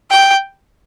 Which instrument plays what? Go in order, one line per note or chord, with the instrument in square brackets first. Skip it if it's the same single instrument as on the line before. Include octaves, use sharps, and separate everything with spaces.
[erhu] G5